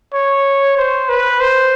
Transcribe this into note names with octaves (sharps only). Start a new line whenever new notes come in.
C#5
C5
B4
C5